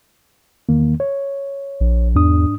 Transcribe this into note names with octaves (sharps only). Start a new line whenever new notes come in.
E2 D#3 A#3
C#5
A#1
E2 G#2 D4 D#6